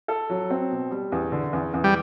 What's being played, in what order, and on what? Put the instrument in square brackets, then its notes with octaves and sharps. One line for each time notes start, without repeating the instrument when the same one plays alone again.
[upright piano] A4
F#3
C4
B2
G3
E2
D3
E2
E2
[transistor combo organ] G3